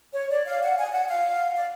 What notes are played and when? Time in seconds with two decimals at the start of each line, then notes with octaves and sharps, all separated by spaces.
0.14 C#5
0.30 D5
0.46 F5
0.61 F#5
0.77 G#5
0.92 F#5
1.08 F5
1.55 D5